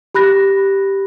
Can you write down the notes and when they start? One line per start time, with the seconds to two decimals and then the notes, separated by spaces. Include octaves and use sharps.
0.14 G4 B5 F#6 A#6